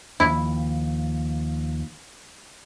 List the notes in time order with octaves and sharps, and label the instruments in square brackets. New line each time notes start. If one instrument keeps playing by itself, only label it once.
[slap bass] D#2 F3 [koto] E4